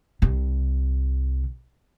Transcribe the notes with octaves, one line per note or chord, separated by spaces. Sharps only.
C2 C3